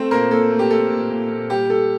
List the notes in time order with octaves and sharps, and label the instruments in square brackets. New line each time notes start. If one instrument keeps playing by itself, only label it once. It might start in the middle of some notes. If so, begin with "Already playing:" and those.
Already playing: [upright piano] A3 C4 C5
A#2 A#3 A#4
A#2 A4
A3
G4
A3 A4
A#2
A#2
A#2
G3 G4
G3 A4